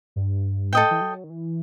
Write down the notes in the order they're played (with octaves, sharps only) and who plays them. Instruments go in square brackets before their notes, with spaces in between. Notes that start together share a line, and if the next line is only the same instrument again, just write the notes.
[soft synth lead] G2
[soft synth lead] A2 [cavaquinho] A4 D#5 G5
[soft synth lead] E3
F#3
D#3
E3